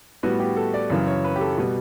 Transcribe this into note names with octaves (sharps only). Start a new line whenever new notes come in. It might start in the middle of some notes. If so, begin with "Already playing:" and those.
A2 G3 B3 F#4
G4
A4
D5
F#2 C#3 E3
C#5
B4
G4
A4
B2 G3 B3